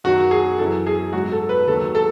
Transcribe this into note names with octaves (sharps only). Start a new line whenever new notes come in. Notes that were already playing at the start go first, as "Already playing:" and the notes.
F#2 D#3 F#3 F#4
G#4
F#2 E3 A4
G#4
G#2 F#3 F#4
A4
B4
D#2 D#3 F#3 A4
A4